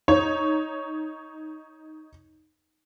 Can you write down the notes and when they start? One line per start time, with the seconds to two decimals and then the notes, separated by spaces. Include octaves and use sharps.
0.08 D#4 C#5